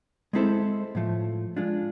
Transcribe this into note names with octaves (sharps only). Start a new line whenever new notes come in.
G#3 C4 E4 A4 C5
A2 F3 A3
G#3 D4 F4